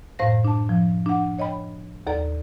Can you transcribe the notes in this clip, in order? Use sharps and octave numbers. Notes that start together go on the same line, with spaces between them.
F#2 A2 C5 F5 A#6
D4 A5
F3
D4 F#5
C#5 D#5 G5 B5
D#2 A4 D5 A#5